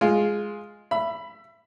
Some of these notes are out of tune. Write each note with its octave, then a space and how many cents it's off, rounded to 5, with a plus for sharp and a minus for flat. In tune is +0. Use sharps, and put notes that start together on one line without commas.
G#3 +0 F4 +5
E5 +25 B5 +0